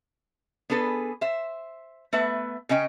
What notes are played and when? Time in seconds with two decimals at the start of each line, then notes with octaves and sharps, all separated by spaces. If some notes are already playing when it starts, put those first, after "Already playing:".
0.70 B3 D4 G#4 A4 B4
1.21 C5 E5
2.13 A3 B3 B4 E5
2.69 C#3 C#4 D#5 G5